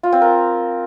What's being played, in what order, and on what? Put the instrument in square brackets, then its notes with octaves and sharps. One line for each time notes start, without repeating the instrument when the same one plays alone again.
[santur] F4
C4
A#4